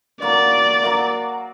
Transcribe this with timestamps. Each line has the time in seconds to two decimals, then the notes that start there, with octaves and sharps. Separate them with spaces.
0.21 F#3 A#3 F#4 D5
0.82 F#3 A#3 F#4